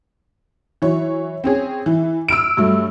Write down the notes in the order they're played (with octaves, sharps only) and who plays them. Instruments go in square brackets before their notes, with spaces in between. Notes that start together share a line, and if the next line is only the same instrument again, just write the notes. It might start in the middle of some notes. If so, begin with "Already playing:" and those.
[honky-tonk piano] E3 F#3 C#5
C4 C#4 G#4
E3
E6 F6 D7
G2 F#3 A3